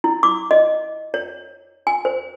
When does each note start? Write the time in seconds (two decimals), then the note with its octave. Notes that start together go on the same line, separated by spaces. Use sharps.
0.04 E4
0.23 D6
0.51 D#5
1.14 C#5
1.87 G#5
2.05 C5